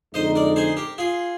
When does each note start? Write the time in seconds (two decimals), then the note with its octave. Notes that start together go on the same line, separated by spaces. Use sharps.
0.14 F2 D3 G#3 D#4 C5 D#5
0.35 A#4 D5
0.56 G#4 C5
0.77 G4 A#4
0.98 F4 G#4